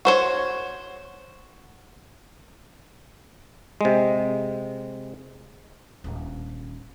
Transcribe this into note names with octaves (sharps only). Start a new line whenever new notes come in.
F#4 C5 C#5
C3 G#3
D#1 D4